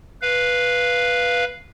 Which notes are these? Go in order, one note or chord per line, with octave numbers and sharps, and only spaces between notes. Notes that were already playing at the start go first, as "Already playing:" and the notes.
B4 F5